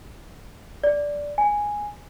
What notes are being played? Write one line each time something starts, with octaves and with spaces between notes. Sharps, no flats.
D5
G#5